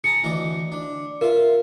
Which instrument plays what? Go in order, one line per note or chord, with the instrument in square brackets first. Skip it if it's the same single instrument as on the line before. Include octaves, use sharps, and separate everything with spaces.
[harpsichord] G#4 A5 A#5 [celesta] C#7
[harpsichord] D2 E3 D#5
D4
[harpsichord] F4 E5 [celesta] A#4